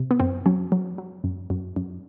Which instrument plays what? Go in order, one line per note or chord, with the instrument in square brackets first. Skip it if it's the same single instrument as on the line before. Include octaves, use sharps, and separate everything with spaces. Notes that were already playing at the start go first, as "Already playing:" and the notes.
Already playing: [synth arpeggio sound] C3
B3
F#2 C4
F#3 C#4
F#3
F#3
F#2
F#2
F#2